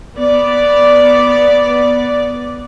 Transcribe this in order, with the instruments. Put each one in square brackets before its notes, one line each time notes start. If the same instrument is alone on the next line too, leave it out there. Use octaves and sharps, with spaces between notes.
[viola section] B3 D5